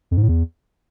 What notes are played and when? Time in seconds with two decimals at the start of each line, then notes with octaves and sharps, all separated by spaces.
0.11 F2
0.17 G#2
0.23 A2
0.28 E2